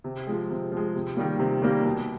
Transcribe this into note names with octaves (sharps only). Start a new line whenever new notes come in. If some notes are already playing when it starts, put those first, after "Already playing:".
C3
F3 G#3
C3
F3 G#3
C3
D#3 G3 A#3
C3
D#3 G3 A#3
B2